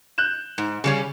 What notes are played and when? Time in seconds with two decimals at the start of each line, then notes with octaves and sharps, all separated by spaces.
0.18 F#6 G6 E7
0.58 G#2
0.84 C#3 G3 C#4